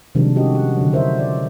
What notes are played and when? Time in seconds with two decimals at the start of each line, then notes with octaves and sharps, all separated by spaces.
0.15 C3 D#3 F3 G3 G#3 D4
0.35 C#4 F#4 G4 D#5
0.55 F#5
0.77 D3 F#3
0.92 E4 A#4 C5 C#5 D#5 E5
1.19 D5